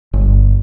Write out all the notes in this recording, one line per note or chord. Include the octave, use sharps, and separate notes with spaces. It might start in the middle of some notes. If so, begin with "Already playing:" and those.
G1